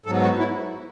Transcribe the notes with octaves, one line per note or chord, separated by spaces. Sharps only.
G#2 F#3 B3 A4
F#4
E4